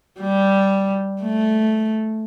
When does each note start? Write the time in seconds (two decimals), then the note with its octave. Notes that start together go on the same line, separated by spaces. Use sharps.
0.21 G3
1.22 A3